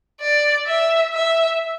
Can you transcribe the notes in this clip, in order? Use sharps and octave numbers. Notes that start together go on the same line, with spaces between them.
D5
E5
E5